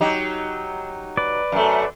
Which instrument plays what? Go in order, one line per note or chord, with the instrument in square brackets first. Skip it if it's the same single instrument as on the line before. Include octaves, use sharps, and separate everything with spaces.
[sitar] F#3 D#4 G4
[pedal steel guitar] B4 D5
[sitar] F#2 A3